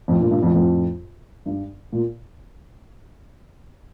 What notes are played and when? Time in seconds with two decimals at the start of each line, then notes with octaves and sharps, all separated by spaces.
0.08 F2 A2
0.20 G2 A#2
0.31 G2 A#2
0.43 F2 A2
0.54 F2 A2
1.46 G2
1.92 A#2